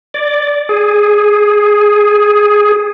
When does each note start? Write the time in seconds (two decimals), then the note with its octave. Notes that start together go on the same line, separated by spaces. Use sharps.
0.14 D5
0.69 G#4